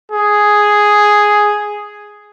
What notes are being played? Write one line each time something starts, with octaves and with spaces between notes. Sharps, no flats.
G#4